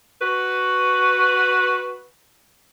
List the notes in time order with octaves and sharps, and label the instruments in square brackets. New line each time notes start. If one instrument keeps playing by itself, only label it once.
[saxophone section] F#4 B4